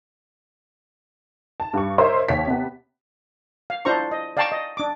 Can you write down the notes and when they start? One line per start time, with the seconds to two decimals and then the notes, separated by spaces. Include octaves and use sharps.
1.60 A5
1.73 G2 C#6
1.98 A#4 C5 C#5 D#5 E5 C6
2.29 D#2 C#5 B6
2.47 C3 B3
3.70 F5
3.85 D4 E4 F4 C5 A#5 C#6
4.11 D#5
4.37 D5 F5 G5 A5 A#5 C#6
4.52 D#5
4.77 D4 D6